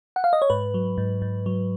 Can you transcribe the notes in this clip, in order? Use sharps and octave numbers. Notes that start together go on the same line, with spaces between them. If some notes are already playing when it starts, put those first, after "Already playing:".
F#5
F5
D#5
C#5
G#2 B4
F#3
G#2
G#2
F#3